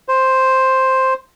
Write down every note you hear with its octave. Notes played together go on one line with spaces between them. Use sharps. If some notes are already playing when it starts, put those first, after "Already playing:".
C5